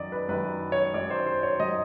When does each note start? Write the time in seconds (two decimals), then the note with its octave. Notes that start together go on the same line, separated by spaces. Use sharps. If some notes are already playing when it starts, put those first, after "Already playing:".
Already playing: F#2 D#3 D5 D#5
0.12 B4
0.29 F#2 D#3 B4
0.72 C#5
0.94 F#2 D#3 D5
1.10 C5
1.26 C5
1.43 C#5
1.59 F#2 D#3 D#5